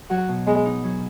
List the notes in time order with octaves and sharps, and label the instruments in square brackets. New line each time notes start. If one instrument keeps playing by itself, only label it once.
[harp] F#3 [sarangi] F#4
[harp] B2
[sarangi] G#3 [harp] B3
[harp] D#4
F#3